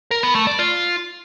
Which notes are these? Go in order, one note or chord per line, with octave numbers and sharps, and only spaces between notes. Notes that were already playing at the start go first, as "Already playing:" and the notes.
A#4
B3
A3
D5
F4